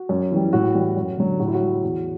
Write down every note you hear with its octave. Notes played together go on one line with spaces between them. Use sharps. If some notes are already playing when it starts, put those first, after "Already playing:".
Already playing: F#4
F#2
E3 G3
A2 F#4
E3 G3
F#2
D3 F#3
A2 F#4
E4
F#4
G3
E2